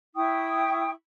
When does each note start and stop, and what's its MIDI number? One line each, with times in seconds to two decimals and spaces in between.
0.15 0.90 64
0.15 0.90 79
0.15 0.90 85
0.15 0.90 87